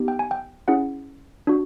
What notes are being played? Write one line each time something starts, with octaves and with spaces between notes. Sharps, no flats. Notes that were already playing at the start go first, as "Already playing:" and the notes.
Already playing: B3 D#4 G4
G5
G#5
G5
C#4 E4 G#4 F#5
D4 F#4